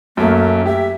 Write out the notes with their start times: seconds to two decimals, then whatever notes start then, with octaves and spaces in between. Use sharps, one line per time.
0.17 F#2 A3 A#3
0.66 G4 E5